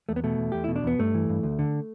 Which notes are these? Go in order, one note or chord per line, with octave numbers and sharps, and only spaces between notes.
E2 A3
B3
B2 A3
E2
E2 G4
B2 E4
D4
E2 B3
G2 A3
E3
G2
D2
D3